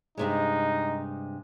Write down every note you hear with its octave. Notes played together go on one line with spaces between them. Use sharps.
G2 C3 G#3 D#4